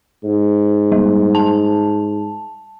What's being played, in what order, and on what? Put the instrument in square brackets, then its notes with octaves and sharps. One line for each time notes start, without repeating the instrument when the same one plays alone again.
[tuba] G#2
[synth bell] G3
A5